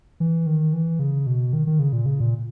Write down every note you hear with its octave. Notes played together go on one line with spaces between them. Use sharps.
E3
D#3
E3
C#3
B2
D#3
D#3
C#3
A#2
C#3
A#2